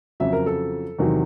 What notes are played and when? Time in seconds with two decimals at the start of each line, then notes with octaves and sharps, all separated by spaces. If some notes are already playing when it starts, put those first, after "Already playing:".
0.20 F2 C#3 F#3 E5
0.33 A#4
0.46 A4
0.99 E2 C3 D#3 F#3